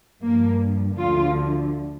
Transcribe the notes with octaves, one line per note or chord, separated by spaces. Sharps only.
G2 F3 A#3
D2 D3 F3 F4